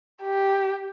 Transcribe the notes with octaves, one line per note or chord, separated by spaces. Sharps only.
G4